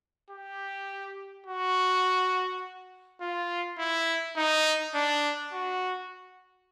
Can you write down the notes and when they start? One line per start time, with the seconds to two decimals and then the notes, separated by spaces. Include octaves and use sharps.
0.31 G4
1.47 F#4
3.21 F4
3.79 E4
4.37 D#4
4.95 D4
5.53 F#4